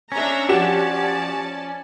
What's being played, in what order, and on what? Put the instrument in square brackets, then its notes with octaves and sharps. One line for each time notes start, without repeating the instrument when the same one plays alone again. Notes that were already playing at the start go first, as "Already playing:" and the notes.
[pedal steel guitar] C#4 [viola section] D4 E5 A#5
[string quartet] F3 [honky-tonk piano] F#4 G4 E7 [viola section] D5 A5